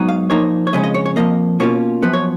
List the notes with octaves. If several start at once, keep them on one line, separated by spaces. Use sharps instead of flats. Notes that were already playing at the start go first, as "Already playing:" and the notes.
Already playing: G#2 F#3 B3 D#4
F5
A#2 F3 A#3 D#4 C#5
C#5
F2 C#3 G#3 C#4 D#5
D#5
C#5
C#5
F2 F3 A#3 D#5
B2 A#3 C#4 F4 C#5
F#2 F3 B3 B4
C#5